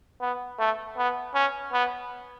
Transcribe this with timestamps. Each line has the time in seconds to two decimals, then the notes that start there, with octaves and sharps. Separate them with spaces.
0.21 B3
0.59 A3
0.97 B3
1.34 C#4
1.73 B3